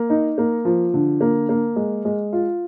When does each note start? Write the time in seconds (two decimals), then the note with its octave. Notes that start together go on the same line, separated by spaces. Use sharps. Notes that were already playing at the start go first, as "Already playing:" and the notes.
Already playing: A#3
0.10 D#4
0.38 A#3
0.65 F3
0.94 D3
1.21 A#3
1.49 A#3
1.76 G#3
2.05 G#3
2.33 F4